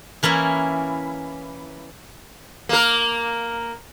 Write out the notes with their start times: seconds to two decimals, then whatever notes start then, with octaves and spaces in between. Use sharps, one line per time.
0.23 E3 A#3 C#4 E4
2.69 A#3 A#4